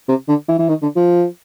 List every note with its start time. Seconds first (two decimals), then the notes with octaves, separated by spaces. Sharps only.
0.08 C3
0.28 D3
0.48 E3
0.59 E3
0.68 D#3
0.82 D3
0.96 F3